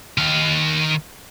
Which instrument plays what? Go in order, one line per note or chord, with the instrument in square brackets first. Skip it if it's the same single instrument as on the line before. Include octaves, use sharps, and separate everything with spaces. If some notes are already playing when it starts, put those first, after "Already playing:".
[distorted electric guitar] D#3 F5